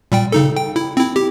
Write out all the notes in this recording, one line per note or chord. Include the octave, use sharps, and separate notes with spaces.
A#2 G3 G5
C#3 D#4 A4
G5
E4
C4 E4
G4